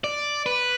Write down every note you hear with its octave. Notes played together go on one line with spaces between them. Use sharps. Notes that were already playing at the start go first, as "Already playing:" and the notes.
D5
B4